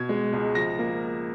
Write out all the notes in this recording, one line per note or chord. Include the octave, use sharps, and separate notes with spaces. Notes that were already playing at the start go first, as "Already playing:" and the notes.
Already playing: B2 G#6
G#3
C#2
F3 A#6
A#3